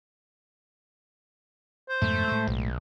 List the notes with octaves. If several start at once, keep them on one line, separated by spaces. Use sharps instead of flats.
C5
F2 G#2 B2 A3
A2 G#3
B1